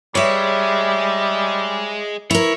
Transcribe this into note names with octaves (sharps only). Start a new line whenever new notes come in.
G3 G#3 C#5 E5
E4 A#4 C#5